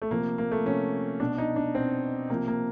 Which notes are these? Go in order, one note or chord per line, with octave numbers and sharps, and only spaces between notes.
A3
C3 F3 A#3
A#3
A3
C3 F3 C#4
B2 D4
D#4
D4
B2 C4
C3 F3 A#3
A#3